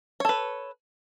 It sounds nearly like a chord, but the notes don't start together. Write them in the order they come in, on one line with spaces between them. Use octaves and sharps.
C#5 A4 B4